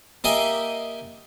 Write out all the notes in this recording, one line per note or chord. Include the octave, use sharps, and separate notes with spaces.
A#3 G4 D#5 E5 G#5